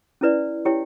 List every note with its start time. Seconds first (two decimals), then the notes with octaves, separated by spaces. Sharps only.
0.21 C#4 E4 B4 D5
0.65 E4 G4 C#5 G5